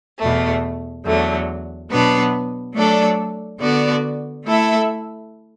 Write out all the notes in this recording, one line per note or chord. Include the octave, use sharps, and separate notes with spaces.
E2 B2 A3
E2 D3 F#3 A3
B2 F#3 B3 D4 B4
F#3 A3 D4 A4 D5
D3 B3 F#4 D5
A3 E4 A4 E5